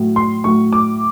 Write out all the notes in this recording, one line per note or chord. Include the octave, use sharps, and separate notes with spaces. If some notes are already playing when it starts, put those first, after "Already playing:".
Already playing: A2 F#3 A3
C6
A2 F#3 A3 C#6
D6